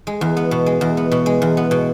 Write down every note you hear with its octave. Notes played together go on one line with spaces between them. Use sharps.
G#3
E2
B3
B2
G#3
E2
B3
B2
G#3
E2
B3
B2